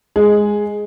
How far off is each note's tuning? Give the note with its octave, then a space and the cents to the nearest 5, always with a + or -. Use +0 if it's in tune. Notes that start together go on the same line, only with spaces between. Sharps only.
G#3 +0 G#4 +10